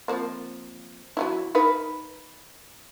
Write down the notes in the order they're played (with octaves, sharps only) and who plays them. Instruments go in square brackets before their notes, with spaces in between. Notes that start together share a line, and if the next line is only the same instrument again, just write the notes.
[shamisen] F3 A#3 C4
F#3 D#4 E4
D#4 A#4 B4